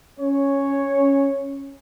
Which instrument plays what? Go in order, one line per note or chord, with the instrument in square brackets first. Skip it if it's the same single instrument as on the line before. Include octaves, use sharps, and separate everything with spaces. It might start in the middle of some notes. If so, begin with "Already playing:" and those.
[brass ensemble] C#4 C#5